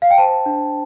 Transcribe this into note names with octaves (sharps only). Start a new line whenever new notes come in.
F5
G5
C5 A5
D4